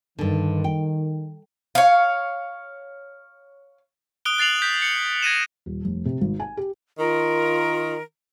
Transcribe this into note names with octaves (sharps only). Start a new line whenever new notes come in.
G2 D3 D#3
G5
C#5 F5
D#6 F#6 D7 G7
F#6 A6 C7 F7 F#7
G6 B6 F7
C#7 F#7
G#6 A#6 D#7 E7
D#1
F1
C3
G#1
G#5
G4
D#3 F4 A#4